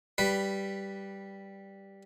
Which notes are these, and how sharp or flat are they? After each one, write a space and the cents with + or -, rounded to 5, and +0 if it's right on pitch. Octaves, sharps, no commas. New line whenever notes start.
G3 +0 B4 +0